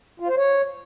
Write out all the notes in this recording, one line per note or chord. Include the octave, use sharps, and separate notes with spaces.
F4
C5
C#5